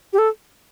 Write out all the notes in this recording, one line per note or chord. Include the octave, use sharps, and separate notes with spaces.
G4
A4